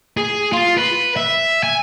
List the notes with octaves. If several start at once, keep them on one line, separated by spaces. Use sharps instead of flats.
G#4
F4
B4
E5
G#5